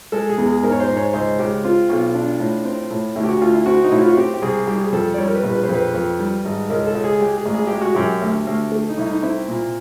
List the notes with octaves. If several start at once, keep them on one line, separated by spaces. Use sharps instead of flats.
G#3 A4
G#4
E2
G#4
G#2 A#4
C#5
C5
G#2
C#5
C#2 C5
C#2 G4
C4 F4
B1
D4
A2
C4
A2
D2 E4
G4
F#4
D2 F4
E4
C4 F#4
D#4
A2 E4
F4
F#4
C4 G4
G4
C2 G#4
G3 G4
G#4
F2 A4
D5
G3 C#5
A#4
B4
A#1
B4
C5
F2
B4
F2
G3
G#1
C#2 A#4
A4
C#2
G#4
G#3 G4
G#4
A1
G#4
G#3 G4
F#4
F#2 G4
D2
D2
A3
D#4
C2 E4
D#4
C4 E4
A#2